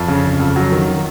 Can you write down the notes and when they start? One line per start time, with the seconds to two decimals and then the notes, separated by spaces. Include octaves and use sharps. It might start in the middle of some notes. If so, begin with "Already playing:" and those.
Already playing: F2
0.08 C#3
0.24 C#3
0.40 F2
0.56 F#3
0.72 D#3
0.88 D#3